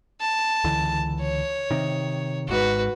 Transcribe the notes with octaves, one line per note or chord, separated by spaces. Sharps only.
A5
C#2 D3 E3
C#5
C3 D#3
G#1 G#2 F#4 B4